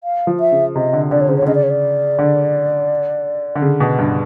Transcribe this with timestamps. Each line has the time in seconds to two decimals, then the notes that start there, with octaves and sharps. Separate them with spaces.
0.04 F5
0.27 F3
0.40 E5
0.52 C#3
0.75 C3 D#5
0.93 D3
1.11 D3 D5
1.21 C#5
1.28 C#3 C5
1.37 C#5
1.42 D3
1.47 C#3 D#5
1.55 D5
1.63 C#5
1.70 D5
2.19 D3
3.55 D3
3.62 C#3
3.80 B2
3.99 G2